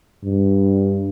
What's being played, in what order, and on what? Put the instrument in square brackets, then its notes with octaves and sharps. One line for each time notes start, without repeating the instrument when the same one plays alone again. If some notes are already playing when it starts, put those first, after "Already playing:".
[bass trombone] G2